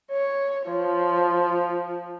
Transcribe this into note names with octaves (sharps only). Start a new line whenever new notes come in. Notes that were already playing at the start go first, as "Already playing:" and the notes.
C#5
F3